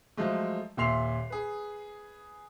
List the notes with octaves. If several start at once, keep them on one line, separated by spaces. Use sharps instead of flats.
F3 F#3 G#3 A3
D#1 A#2 E5 C6 C7 F7
G#4 B4